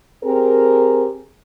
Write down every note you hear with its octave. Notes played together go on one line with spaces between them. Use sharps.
C4 G4 G#4 A#4